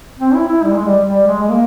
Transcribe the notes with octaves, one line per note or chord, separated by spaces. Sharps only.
C4
E4
E4
G3
G#3
G3
G3
G#3
G#3
A#3